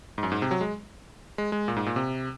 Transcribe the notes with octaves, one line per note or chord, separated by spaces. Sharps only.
G#2
F#2
G#2
C3
F#3
G#3
G#3
G#3
A#2
G#2
A#2
C3